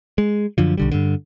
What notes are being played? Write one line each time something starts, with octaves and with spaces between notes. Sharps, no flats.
G#3
F#2 D3 F3
B1 D3 G3
G2 D3